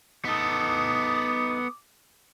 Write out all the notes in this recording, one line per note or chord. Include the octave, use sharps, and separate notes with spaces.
B3 D#4 A4 D6 D#6